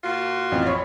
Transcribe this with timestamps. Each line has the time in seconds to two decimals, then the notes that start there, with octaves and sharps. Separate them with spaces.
0.04 A#2 F4 F#4
0.52 A1 F2
0.66 C#5 B5 C#6